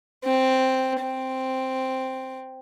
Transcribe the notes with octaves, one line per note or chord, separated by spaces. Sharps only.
C4
C4